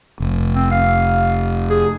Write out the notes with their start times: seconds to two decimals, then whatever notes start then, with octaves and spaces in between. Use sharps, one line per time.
0.20 F1
0.54 C4
0.71 F5
1.70 G#4